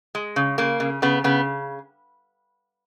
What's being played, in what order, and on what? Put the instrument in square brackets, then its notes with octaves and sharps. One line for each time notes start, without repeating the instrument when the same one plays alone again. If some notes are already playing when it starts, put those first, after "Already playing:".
[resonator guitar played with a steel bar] G#3
C#3
C#3 A#3
C#3
C#3 B3
C#3 B3